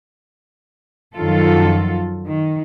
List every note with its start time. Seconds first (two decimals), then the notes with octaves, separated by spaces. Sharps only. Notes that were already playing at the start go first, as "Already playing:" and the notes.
1.15 F#2 D#3 F3 F#3 F4 A4
2.28 D#3